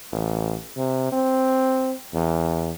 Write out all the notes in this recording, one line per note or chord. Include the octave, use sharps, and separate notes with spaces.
A1
C3
C4
E2